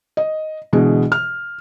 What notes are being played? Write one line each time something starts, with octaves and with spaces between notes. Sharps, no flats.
D#5
B2 D3 E3 G#3
F6